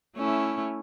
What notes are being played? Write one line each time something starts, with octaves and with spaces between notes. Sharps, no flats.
A3 C#4 E4